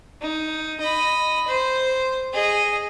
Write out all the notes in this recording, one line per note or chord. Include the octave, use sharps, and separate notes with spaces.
D#4
D#5 B5
C5
G#4 D#5